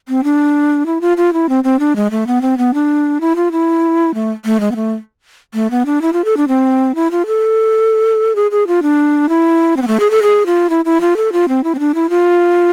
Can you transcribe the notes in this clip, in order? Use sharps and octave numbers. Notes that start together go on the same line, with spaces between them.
C4
D4
E4
F4
F4
E4
C4
C4
D4
G#3
A3
B3
C4
B3
D4
E4
F4
E4
A3
A3
G#3
B3
A3
A3
B3
D4
E4
F4
A4
D4
C4
E4
F4
A4
G#4
G#4
F4
D4
E4
C4
B3
A3
G#4
A4
G#4
F4
E4
E4
F4
A4
F4
C4
E4
C4
D4
E4
F4